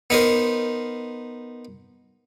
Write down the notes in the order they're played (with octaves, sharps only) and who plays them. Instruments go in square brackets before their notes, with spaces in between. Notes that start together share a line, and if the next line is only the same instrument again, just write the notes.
[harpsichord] B3 D#4 A#4 C5